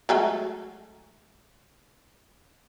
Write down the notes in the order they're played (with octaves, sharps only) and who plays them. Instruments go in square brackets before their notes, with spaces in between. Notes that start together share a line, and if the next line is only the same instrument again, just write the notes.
[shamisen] F#3 G#3 A3